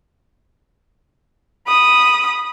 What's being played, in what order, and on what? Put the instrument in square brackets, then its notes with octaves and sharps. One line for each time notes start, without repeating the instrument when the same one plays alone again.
[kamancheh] B5 D#6